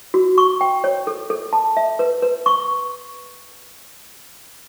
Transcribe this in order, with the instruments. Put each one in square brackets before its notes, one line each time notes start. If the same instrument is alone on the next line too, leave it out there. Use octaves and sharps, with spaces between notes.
[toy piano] F#4
C#6
G5
C#5
A4
A4
A5
E5
B4
B4
C#6